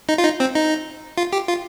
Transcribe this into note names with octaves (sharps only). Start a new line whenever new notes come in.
D#4
F4
D#4
C4
D#4
F4
G4
F4